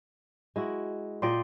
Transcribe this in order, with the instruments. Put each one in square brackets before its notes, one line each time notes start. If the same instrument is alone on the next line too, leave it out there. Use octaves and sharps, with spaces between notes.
[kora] G#3 E4 F#4
[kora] A#2 D5 D#5 [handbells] F4 G5 C6